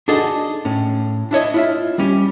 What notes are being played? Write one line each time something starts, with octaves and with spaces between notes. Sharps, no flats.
D4 D#4 F#4 G#4 A4 D#5
A2 C#4
D4 E4 C#5 D#5
E4 F4 E5
G3 C#4 G4